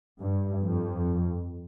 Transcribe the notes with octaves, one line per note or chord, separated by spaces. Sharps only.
G2
F2